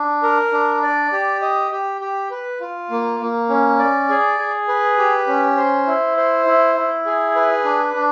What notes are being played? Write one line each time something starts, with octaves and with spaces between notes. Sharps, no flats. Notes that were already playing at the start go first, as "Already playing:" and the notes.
Already playing: D4
A#4
D4
D5
G4
D#5
G4
G4
B4
F4
A#3
A#3
C#4
D5
G#4
G#4
B4
G4
C#4
C5
E4
C5
E4
E4
G#4
B4
D4
D4